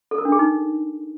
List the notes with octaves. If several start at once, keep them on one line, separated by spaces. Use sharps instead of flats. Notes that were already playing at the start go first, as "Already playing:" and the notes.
A4
A#4
D4
G#4
D#4